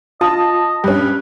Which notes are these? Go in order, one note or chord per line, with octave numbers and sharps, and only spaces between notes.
F4 D#5 A5 D#6
G2 C#4 G4 B4